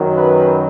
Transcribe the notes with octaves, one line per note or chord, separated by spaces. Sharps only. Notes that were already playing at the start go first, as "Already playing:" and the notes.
Already playing: F#2 D#3 F#3
B4